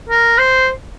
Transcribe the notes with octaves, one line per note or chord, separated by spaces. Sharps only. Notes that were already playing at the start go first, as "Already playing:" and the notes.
A#4
C5